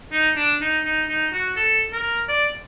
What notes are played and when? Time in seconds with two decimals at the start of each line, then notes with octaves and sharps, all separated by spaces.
0.12 D#4
0.36 D4
0.61 D#4
0.84 D#4
1.09 D#4
1.33 F#4
1.57 A4
1.93 A#4
2.29 D5